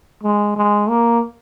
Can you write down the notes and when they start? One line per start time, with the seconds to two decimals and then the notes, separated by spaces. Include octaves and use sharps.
0.24 G#3
0.56 G#3
0.89 A#3